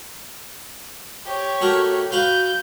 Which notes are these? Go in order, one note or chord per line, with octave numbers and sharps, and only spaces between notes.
G4 C#5
A3 F#4 A#4
F#4 B4 F5 G6